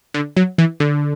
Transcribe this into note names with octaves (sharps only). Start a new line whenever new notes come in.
D3
F#3
E3
D3